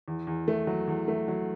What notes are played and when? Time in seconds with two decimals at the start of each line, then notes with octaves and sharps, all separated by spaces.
0.08 E2
0.27 E2
0.48 A3
0.67 F#3
0.87 E2
1.08 A3
1.28 F#3